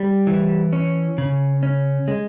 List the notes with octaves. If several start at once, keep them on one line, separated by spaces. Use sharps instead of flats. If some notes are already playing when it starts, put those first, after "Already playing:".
Already playing: G3
E3
C#4
C#3
C#4
G#3